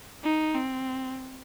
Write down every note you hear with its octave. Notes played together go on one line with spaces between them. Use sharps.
D#4
C4